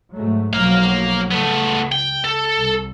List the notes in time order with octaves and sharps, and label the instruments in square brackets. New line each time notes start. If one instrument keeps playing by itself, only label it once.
[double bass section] G#2 F#3 A3
[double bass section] B1 F3 F#3 [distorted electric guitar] A#3 F5
[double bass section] C#2 [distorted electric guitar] A3 B3
[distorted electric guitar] G5
A4
[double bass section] C2